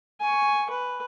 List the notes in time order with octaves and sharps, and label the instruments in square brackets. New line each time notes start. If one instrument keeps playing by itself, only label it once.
[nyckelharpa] G#5 C#6
B4